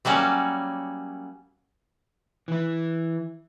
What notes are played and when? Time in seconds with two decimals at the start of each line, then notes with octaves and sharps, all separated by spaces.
0.05 F#3 G3 A#3 C#4
2.48 E3 E4